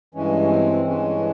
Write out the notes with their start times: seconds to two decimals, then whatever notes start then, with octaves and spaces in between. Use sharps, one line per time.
0.14 G2 E3 G#3 C#4
0.42 C#4
0.50 C4
0.85 G2 E3 G#3 C#4